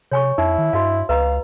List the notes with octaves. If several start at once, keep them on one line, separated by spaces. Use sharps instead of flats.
C3 C#5 G#5 C#6
F2 D#4 E4
D#3
G2 F#4 D#5 F5
C#2 B4 D#5 F5 A#5